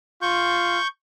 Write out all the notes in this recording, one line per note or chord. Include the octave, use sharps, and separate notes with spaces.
F4 C#6 G6